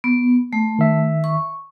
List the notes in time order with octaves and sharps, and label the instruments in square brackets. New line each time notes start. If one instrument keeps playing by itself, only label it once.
[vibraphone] B3
A3
[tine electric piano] D#3 E5
[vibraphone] C#6